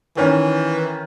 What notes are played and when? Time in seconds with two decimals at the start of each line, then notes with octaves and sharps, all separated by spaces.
0.17 D#3 E3 C#4